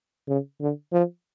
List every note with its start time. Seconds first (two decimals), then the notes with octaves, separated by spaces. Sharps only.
0.28 C#3
0.61 D3
0.92 F3